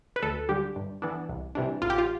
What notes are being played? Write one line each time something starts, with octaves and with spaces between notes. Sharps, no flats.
B4
D2 A4
D3 G3 G4
G2
E3 B3 D4
C2
C3 E3 G3 D4
A1 F4
G4
F4